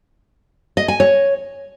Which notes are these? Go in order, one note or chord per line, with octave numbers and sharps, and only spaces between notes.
D#5
G#5
C#5